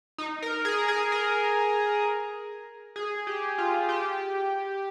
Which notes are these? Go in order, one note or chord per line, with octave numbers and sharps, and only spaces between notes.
D#4
A#4
G#4
G#4
A#4
G#4
G4
F4
G4